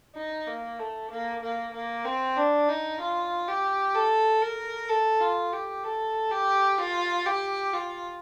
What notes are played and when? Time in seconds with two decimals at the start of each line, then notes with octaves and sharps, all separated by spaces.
0.16 D#4
0.47 A#3
0.79 A3
1.11 A#3
1.42 A#3
1.73 A#3
2.05 C4
2.37 D4
2.68 D#4
3.00 F4
3.48 G4
3.95 A4
4.42 A#4
4.89 A4
5.20 F4
5.53 G4
5.84 A4
6.31 G4
6.79 F4
7.26 G4
7.73 F4